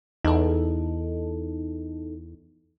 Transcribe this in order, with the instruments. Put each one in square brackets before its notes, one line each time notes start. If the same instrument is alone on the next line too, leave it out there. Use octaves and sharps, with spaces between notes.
[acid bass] E2 [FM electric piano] D#4 A4